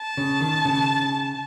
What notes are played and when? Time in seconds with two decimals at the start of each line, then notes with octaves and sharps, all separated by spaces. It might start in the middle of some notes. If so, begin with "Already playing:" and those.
Already playing: A5
0.17 C#3
0.41 D#3
0.65 C#3